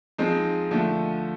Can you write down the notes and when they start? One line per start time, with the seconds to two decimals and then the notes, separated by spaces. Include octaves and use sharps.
0.18 F3 G#3 C4 D#4
0.71 D3 F3 A3